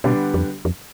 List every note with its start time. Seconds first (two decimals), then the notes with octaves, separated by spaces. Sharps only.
0.04 B2 D3 G3 B3 D4
0.34 F2
0.65 F2